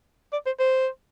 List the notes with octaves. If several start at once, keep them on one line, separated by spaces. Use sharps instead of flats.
D5
C5
C5